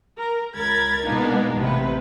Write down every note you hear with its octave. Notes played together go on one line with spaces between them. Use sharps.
A#4
C#2 A#4 B5 G#6 A6
B2 G#3 A#3 B3 D4 D#4
A1 C3 B4